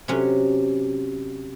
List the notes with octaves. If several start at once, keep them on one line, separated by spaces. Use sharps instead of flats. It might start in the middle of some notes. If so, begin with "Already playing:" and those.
C3 F#3 C#4